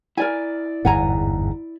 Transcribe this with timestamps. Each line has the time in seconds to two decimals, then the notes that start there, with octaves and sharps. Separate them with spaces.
0.17 E4 A#4 D5 G#5
0.85 G1 E2 G#2 F#5 G#5 A#5